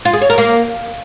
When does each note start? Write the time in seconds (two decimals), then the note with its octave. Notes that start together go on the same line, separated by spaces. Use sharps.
0.05 F4
0.13 G#4
0.22 C#5
0.30 A#4
0.38 A#3